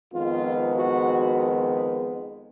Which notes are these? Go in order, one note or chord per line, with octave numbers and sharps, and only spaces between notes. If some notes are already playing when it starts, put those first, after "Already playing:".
F2 D#3 G#3 B3 F4
F#4